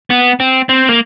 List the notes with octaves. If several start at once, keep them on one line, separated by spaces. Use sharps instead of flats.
B3
C4
C4
A#3